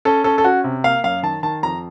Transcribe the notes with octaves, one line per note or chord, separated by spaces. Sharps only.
C#4 A4
C#4 A4
A4
C#4 F#4
C3
A#3 F5
F#2 F5
D#3 A5
D#3 A5
F2 A#5